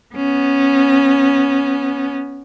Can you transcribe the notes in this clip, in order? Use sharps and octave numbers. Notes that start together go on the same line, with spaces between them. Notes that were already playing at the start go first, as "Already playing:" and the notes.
B3 C#4